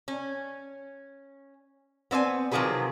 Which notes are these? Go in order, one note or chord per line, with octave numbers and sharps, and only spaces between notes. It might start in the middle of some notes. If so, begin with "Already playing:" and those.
C#4
B3 C4 D5 G#5
C3 D#3 F3 F#3 G#4 B4